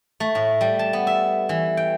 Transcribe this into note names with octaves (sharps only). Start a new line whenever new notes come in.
A3
A2
G3
A5
B3
E5
E3
G5